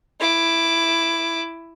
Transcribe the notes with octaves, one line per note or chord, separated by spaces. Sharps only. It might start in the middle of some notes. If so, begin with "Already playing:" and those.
E4 D6